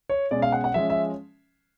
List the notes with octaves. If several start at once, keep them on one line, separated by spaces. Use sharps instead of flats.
C#5
B2 G#3 C#4 D5
F5
F#5
F#5
F3 G#3 C#4 E5
E5